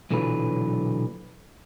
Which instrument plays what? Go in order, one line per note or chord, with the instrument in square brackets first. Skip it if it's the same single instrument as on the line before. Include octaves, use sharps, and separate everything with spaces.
[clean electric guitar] B1 A#2 D3 E3 F#3 B4